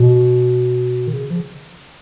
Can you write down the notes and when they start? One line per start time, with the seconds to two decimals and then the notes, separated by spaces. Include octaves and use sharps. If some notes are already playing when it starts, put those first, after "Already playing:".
Already playing: B2
1.07 D#3
1.14 C#3
1.30 F3